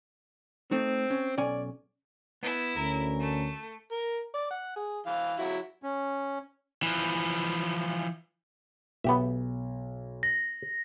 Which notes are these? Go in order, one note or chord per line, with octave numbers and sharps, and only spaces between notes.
A3 C4 D#4
C#4
B1 C#4 D5 G#5
B3 E4
D2 C#4 A#4
A3
A#4
D5
F#5
G#4
E3 F5
F#3 E4 F#4
C#4
E3 F3
B1 B3 G4 E5
A#6